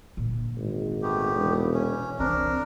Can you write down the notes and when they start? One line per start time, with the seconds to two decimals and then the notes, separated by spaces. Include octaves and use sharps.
0.17 A#2 D3
0.57 G#1
1.03 A3 B3 G4
1.35 E1
1.74 C#4
2.19 C2 E3 C4 D4 A#4